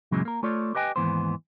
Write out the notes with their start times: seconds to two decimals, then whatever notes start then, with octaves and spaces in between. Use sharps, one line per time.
0.11 F#2 A#2 C#3 E3 F#3 G#3
0.25 A#3 A#4
0.43 A3 F4 A4 C#5 D5
0.75 G4 B4 D#5 G5 G#5
0.96 D#2 G#2 D#3 E3 B3 C5